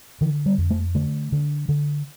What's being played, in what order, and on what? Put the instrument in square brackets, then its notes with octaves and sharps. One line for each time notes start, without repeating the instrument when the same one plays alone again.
[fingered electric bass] D3 E3
G3
F2
A3
D3 A3
D3
D3